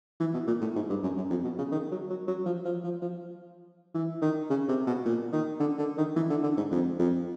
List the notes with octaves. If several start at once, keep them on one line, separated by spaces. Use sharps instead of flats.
E3
B2
A#2
A2
G#2
G2
F#2
F#2
F2
B2
C#3
D#3
F#3
F#3
F#3
F3
F3
F3
F3
E3
D#3
C#3
C3
B2
A#2
D#3
D3
D3
D#3
E3
D3
D3
G#2
F2
F2